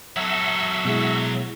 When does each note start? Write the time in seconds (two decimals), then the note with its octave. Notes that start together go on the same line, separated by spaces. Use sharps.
0.17 F#3 A4 E5 F#5 E6
0.85 B2 G#3 E4